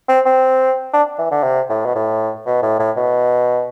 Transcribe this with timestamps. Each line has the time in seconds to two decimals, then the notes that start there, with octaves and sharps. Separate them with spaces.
0.09 C4
0.26 C4
0.93 D4
1.18 E3
1.31 D3
1.43 C3
1.69 A2
1.85 B2
1.95 A2
2.46 B2
2.62 A2
2.79 A2
2.96 B2